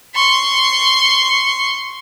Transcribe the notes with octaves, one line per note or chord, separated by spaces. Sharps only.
C6 C#6